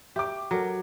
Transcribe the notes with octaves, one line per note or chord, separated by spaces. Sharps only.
G4 E5 C#6 D6
F#3 A4 A#4